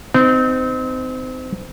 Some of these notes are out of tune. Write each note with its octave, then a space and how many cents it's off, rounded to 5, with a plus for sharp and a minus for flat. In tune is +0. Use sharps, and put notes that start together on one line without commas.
C4 -30 D#4 +0